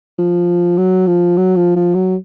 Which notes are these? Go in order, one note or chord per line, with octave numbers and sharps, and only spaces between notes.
F3
F#3
F3
F#3
F3
F3
F#3